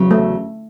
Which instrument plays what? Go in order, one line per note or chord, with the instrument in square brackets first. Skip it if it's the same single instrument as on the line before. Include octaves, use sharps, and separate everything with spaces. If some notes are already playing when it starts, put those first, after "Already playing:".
Already playing: [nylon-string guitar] E2 C#3 F#3
[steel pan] A3